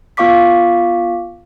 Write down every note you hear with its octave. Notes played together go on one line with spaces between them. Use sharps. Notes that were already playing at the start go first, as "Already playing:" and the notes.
B3 F4 F5 C#6 D6 B6